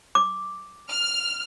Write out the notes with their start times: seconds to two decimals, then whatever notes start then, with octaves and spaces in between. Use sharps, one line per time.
0.15 D6
0.89 F6